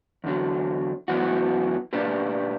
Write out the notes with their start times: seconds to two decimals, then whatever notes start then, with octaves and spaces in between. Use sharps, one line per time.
0.24 E2 D3 F#3
1.08 F#2 E3 B3 F#4
1.93 A#2 A#3 D4 G4 B4